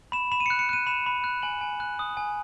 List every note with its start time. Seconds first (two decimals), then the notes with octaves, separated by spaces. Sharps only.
0.12 B5 E7
0.32 B5 E7
0.40 D#7
0.46 C#7
0.50 F#6
0.59 C#7
0.69 F#6 D#7
0.87 B5 E7
1.06 B5
1.24 F#6
1.42 G#5 F#7
1.61 G#5
1.80 F#6
1.99 D#6
2.17 G#5